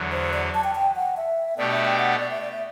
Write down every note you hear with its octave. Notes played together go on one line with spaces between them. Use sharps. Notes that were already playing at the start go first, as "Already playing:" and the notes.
Already playing: E2 D3 F#3
C5
D5
A5
G5
G5
F#5
E5
B2 A3 D4 G4 D5
E5
G5
F#5
D5
E5
D5
E5